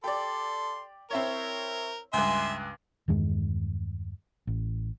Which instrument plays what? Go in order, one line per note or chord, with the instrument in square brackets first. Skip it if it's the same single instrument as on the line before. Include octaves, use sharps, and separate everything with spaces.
[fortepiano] G4 D5 [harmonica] A4 C6
[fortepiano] C4 E4 C#5 [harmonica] A#4
[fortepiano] C#2 G2 [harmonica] E5 G#5 C6
[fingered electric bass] E2 G2 D#3 G#3
A1